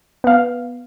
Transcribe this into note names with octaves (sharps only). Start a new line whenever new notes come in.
B3 F5